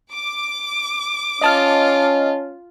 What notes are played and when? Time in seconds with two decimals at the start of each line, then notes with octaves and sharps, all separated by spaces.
0.11 D6
1.41 C#4 F4 D#5 A5 F6